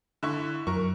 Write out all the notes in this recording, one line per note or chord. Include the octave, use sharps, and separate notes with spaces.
D3 E4 C#6
F#2 A#4 C#6